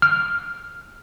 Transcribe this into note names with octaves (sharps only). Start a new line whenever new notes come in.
F6